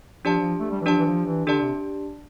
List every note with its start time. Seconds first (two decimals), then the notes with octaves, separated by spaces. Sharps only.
0.25 F3 D4 G4 D5 A5
0.40 F3
0.59 A3
0.71 G3
0.81 E3
0.86 F3 D4 G4 D5 A5
0.98 E3
1.06 F3
1.26 E3
1.46 D3 D4 G4 D5 A5
1.61 C3